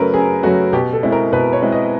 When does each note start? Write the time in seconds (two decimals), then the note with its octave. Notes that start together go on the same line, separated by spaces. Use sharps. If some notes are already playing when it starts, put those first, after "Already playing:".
Already playing: F#2 C#3 F#3 A3 A#4 B4
0.13 F#2 G#4
0.43 C#3 F#3 A3 F#4
0.73 B2 G4
0.93 A4
1.03 G#3 C4 E4
1.12 A#4
1.33 B2 B4
1.53 C#5
1.62 G#3 C4 E4
1.72 D#5